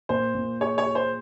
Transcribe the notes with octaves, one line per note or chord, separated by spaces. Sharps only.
A#2 C5
A#2
G#4 C#5
C#5
G#4
C5